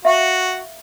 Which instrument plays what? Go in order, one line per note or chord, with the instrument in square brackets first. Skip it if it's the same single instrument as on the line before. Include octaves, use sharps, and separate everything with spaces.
[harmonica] F#4 [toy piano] E5 F5